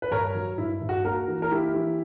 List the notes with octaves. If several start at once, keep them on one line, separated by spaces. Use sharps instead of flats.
B4
G2 A#4 C#5
F#3
G2 E4
G2
F#4
A#3 F#4 A#4
E3
A#4
A#3 E4 G4
E3